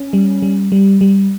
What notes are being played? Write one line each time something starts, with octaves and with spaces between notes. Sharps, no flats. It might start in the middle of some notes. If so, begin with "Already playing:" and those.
Already playing: C#4
G3
G3
G3
G3